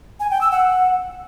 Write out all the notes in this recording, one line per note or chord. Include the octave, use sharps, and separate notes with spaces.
G#5
G5
E6
F#5